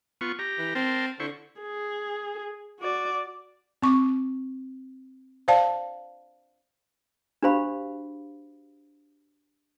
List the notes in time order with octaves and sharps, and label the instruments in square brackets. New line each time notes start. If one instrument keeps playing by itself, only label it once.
[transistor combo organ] B3 F4 C#6
G4 A#5
[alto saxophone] E3
[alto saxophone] C4 [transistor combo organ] A#4 A5 C6
[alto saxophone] D3 [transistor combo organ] E4 C5 C#6
[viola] G#4
F#4 D5
[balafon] C4 C#6 D6
C5 D5 F5 A5
[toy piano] D4 F#4 G4 C5 F5 B5